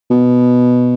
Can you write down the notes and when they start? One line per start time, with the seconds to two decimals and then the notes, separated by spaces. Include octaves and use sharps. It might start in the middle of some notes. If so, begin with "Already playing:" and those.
0.11 B2